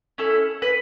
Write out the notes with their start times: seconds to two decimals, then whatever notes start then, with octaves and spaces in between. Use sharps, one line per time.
0.18 C#4 E4 A4
0.62 B4